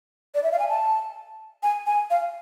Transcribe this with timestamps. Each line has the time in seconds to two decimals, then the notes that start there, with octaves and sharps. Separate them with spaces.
0.35 D5
0.44 E5
0.52 F5
0.59 G#5
0.69 A5
1.63 G#5
1.86 G#5
2.10 F5